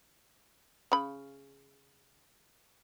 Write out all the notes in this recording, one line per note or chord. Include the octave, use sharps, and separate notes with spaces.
C#3 B5